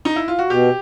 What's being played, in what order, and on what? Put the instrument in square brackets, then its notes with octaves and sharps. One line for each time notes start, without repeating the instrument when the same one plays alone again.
[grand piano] D#4
E4
F4
F#4
[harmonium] B2 [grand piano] G4